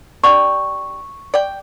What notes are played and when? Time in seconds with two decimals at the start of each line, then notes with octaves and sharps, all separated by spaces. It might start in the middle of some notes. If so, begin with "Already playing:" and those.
0.24 D4 G4 G5 C#6
1.34 D5 G5